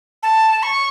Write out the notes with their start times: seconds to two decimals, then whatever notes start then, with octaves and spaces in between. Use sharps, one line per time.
0.23 A5
0.63 C#6